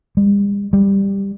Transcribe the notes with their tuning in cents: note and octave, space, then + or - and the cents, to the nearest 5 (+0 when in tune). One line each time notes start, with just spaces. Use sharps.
G3 +45
G3 +10